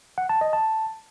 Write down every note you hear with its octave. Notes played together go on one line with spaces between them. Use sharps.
F#5
A5
D#5
A5